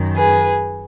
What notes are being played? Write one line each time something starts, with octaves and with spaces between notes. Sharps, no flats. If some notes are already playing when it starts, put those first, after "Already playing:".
Already playing: F#2 D#3
G#4 B4